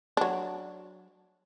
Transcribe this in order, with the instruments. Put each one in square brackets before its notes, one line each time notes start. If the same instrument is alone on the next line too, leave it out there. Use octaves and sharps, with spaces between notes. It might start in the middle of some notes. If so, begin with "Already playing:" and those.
[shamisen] F#3 D4